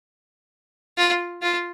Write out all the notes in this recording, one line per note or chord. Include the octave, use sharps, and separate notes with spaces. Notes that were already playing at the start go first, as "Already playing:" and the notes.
F4
F4